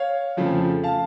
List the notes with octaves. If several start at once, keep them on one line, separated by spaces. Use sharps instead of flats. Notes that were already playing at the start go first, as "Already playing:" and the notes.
Already playing: C#5 F5
F2 C#3 F3 A3
F5 A5